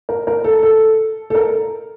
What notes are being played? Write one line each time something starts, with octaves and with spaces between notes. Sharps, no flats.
A#4
A#4
A4
A4
A4
A#4